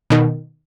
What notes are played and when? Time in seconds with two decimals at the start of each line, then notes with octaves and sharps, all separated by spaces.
0.10 B2 D#3